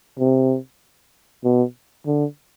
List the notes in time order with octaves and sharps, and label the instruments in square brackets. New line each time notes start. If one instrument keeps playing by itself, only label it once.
[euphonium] C3
B2
D3